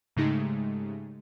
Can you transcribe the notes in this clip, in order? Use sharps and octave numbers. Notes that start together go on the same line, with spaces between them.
G#2 C#3 G#3 A3 D#4 G4